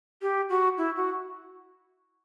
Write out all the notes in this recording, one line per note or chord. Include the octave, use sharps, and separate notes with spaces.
G4
F#4
E4
F#4